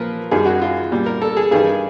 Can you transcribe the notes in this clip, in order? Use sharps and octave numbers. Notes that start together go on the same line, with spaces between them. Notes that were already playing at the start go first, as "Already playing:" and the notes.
Already playing: A#2 F3 A#4 B4
F#2 D#3 G3 G#4
F#4
F4
A#2 G3
A#4
A4
G#4
G2 D#3 G3 G#4